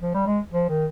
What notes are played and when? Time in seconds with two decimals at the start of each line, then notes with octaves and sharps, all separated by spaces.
0.01 F3
0.14 G3
0.27 G#3
0.52 F3
0.69 D#3